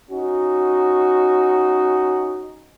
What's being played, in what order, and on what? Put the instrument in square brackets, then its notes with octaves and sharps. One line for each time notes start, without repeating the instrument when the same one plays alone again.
[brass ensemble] C#4 D#4 F#4